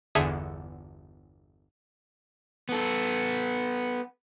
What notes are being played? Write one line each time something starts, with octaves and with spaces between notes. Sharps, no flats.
G1 E2 D3 G#4 E5 A5
B3 A4